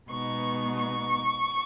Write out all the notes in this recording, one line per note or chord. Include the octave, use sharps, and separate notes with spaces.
B2 G#3 B3 D#4 C#6
C#6